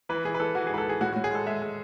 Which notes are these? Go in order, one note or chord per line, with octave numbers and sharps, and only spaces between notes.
E3 B4
E3 G#4
B4
E3 A4
E3 F#4
G#4
G#2 B4
A4
E3 G#4
A2 F#4
F#4
A2
G#4
G#3 A4
G#3 E5
G#3